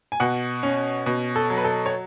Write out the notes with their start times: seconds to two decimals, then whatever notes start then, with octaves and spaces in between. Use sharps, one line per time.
0.12 G#5
0.20 B2 F#5
0.63 C#4
1.06 B2
1.36 A4
1.50 F#3
1.57 B4
1.64 A4
1.86 C#5